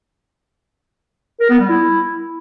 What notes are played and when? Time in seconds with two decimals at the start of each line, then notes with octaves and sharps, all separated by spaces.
1.40 A#4
1.50 B3
1.60 G3
1.69 E4